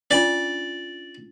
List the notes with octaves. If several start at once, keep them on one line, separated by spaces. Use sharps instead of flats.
C#4 D4 F4 D5